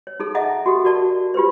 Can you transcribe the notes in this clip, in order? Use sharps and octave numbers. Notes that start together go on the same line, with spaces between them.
C#5
D#4 G#4 A4
G#4 D#5 E5 F#5 A5 A#5
F#4 G4 A4
F#4 A#4 D5 A5
F4 G4 B4 C5